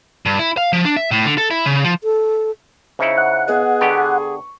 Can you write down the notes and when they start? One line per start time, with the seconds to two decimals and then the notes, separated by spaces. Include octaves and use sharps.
0.26 G2
0.39 E4
0.57 F5
0.73 F3
0.85 D4
0.96 E5
1.11 A2
1.26 D3
1.38 A4
1.51 E4
1.66 C#3
1.84 F3
2.04 A4
2.99 C#3 D#4 E4 C5 E5 C#7
3.18 F#5
3.48 B3 G#4 B4 D#5
3.81 D3 B3 G4 C#6